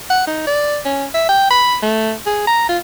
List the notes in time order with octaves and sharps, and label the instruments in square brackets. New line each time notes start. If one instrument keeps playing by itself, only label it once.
[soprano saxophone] F#5
D#4
D5
C#4
E5
G5
B5
A3
G#4
A#5
F4